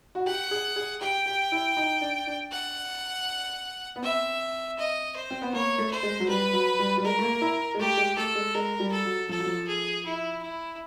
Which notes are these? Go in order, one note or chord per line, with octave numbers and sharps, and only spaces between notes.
F#4
G4 F#5
G#4
G#4
G4 G5
G4
E4
D#4
D4
D4
F#5
B3
C4 E5
D#5
C5
C4
B3
A#3 C#5
A3
C5
G#3
F#3
G3 B4
F#3
G3
G3
G#3 A#4
A3
A#3
E4
G#3
A3 G4
G#3
A3 A4
G#3
G#3 A#4
G3
A4
F#3
F3 A4
F#3
F3
G#4
E4
E4